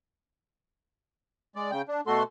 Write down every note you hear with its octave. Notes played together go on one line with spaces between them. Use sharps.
G#3 D5
C#3 G5
D4
B2 A3 F#4 A4 C6